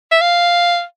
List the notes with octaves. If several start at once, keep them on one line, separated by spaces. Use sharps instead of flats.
E5
F5